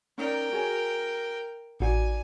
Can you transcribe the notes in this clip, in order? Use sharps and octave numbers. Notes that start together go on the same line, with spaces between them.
C#4 D#4 A#4 D5 G5
F#4 G#4 C#5
A1 D#4 F#4 D5 G#5